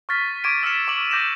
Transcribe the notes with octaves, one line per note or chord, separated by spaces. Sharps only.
C#6 F6 A6 B6
C#6 D6 G#6 D7 D#7
E6 F6 A6 B6 C#7 E7
C#6 D6 F#7
D6 G6 A#6 D#7 E7